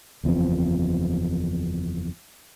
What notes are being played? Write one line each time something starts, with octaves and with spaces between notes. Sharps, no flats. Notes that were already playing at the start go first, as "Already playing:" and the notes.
F#1 E2 F3 C4